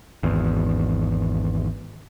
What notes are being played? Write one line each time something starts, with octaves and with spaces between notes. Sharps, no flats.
G#1 E2